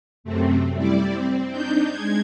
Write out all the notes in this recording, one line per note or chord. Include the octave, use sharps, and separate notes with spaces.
F#2 C3 A3 C4
G3 E4 D5
C4
D4 D#4 G6
G#3 G#6